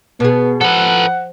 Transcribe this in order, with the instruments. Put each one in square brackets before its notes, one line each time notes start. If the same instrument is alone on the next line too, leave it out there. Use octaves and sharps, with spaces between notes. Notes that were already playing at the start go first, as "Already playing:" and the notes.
[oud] B2 G#4 [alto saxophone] B3
[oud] F3 [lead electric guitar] A4 B4 [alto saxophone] F#5